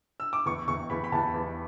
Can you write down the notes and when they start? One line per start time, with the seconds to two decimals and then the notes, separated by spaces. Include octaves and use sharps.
0.20 E6
0.33 D6
0.46 E2 C#6
0.68 E2 C#6
0.90 E2 B5
1.04 B5
1.12 E2 A5
1.34 E2